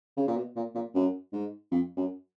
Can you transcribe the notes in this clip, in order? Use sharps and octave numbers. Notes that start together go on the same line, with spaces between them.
C#3
A#2
B2
A#2
A#2
F#2
G#2
F2
F#2